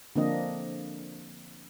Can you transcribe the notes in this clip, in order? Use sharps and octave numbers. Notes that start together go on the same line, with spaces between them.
D3 F3 A#3 C4 D4 D#5